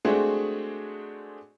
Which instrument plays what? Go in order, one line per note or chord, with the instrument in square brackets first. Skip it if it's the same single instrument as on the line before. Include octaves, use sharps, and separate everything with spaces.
[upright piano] G#3 A3 C4 D4 F#4 G#4